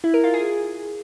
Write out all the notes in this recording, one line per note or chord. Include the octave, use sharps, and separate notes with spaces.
E4
A#4
F4
G#4